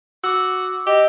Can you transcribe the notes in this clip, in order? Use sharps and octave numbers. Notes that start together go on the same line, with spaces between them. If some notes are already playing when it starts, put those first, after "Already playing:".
F#4 D6 E6
G4 D#5